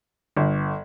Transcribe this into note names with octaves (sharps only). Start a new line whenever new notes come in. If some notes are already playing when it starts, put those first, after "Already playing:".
G1